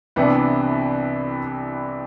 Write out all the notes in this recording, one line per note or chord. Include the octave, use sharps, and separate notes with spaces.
C2 C3 E3 B3 D4